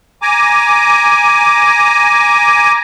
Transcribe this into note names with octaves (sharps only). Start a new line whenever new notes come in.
G#5 A#5 D6